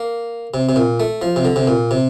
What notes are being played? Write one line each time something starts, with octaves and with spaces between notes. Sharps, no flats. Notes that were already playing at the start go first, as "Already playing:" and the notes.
Already playing: A#3
C3
C3
A#2
A3
F3
C3
D3
C3
A#2
C3